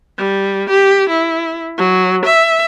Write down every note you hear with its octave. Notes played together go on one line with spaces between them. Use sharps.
G3
G4
E4
F#3
E5